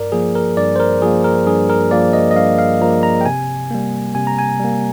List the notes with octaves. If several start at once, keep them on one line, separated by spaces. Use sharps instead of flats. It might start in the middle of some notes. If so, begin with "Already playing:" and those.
Already playing: G2 A#4 D5
F3 A#3 G#4
A#4
G2 D5
C5
A#4
F3 A#3 G#4
A#4
G2 G#4
A#4
F3 A#3 D5
D#5
D#5
G2 F5
F5
F3 A#3 A#5
A#5
G5
C3 G#5
G3 A#3
C3 G#5
A#5
G#5
G3 A#3